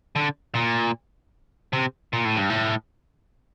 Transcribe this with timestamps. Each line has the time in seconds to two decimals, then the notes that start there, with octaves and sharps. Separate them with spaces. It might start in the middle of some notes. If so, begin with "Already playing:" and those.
0.16 D3
0.55 A#2
1.73 C3
2.13 A#2
2.25 A2
2.37 G2
2.50 A2